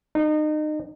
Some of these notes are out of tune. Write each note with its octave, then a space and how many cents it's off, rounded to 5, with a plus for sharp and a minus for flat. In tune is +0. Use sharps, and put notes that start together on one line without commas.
D#4 -30